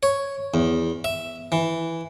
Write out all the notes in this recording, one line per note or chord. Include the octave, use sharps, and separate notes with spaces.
C#5
E2
E5
E3